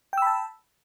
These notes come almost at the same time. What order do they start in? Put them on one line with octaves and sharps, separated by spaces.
G5 E6 B5 A5